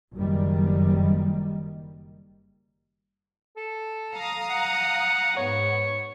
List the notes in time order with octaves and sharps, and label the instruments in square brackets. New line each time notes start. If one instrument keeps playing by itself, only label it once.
[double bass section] F#1 D#3 G3
[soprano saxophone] A4
[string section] F5 A#5 D#6
[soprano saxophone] F#5
[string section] G#2 B3 [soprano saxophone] C#5